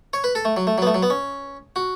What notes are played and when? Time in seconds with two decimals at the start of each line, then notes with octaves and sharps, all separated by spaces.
0.13 C#5
0.24 B4
0.35 A4
0.45 A3
0.57 F#3
0.67 A3
0.78 F#3
0.82 B3
0.87 A3
0.94 F#3
1.03 B3
1.10 C#4
1.76 F#4